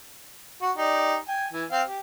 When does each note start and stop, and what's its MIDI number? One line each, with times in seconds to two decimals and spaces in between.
0.61 0.71 66
0.77 1.15 63
0.77 1.15 67
0.77 1.15 74
1.28 1.46 79
1.28 1.46 80
1.53 1.64 52
1.53 1.64 80
1.71 1.82 60
1.71 1.82 77
1.71 1.82 79
1.88 1.99 67